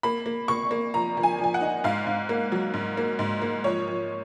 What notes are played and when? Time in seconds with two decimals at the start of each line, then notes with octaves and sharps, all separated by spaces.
0.03 A#3 B5
0.26 A#3
0.48 A#3 C#6
0.71 A#3
0.94 F3 A#5
1.17 F3
1.23 G#5
1.38 F3
1.44 G#5
1.54 F#5
1.61 D#4
1.84 G#2 F5
2.07 G#2
2.29 A#3
2.52 F#3
2.74 G#2
2.97 A#3
3.19 G#2
3.42 A#3
3.64 F3 C#5
3.88 F3